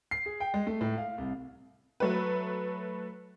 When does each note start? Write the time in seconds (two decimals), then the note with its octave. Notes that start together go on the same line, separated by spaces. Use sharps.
0.11 C7
0.26 G#4
0.40 G5
0.54 G#3
0.67 A3
0.81 A2
0.98 F5
1.18 C2
2.00 F#3 A3 B4